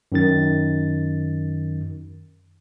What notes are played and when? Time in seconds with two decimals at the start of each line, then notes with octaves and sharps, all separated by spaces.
0.12 F#2 D#3 A6